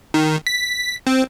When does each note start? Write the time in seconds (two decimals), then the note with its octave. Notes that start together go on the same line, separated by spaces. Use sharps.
0.14 D#3
0.47 B6
1.07 C4